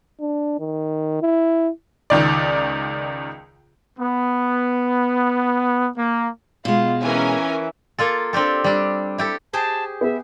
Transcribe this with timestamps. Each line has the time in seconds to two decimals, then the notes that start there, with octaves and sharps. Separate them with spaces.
0.20 D4
0.59 D#3
1.22 E4
2.10 C#2 D#3 D5
3.99 B3
5.97 A#3
6.65 B2 G#3 F4
7.03 E3 C#4 A#4 G#5
7.99 A#3 F4 A4
8.33 C4 D4 G4 A4
8.64 G3 D4
9.18 E4 G4 A4
9.53 G4 G#4 C5 A5
10.01 B3 G#4 E5